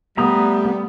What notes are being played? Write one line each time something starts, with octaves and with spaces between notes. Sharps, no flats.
G3 A3 B3 E5 A#5 D#6